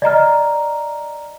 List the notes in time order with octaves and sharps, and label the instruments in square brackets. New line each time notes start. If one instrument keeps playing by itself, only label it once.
[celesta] D5 D#5 A#5 F6